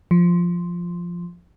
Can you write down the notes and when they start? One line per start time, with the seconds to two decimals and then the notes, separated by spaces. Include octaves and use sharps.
0.11 F3